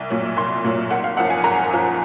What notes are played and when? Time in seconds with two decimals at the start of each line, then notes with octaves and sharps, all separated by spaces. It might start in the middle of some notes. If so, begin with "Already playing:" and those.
Already playing: C2
0.10 A#2 F#3
0.36 C2 C6
0.64 A#2 F#3
0.91 G#1 F#5
1.04 F5
1.17 F#2 F3 F#5
1.30 G#5
1.44 G#1 A#5
1.70 F#2 F3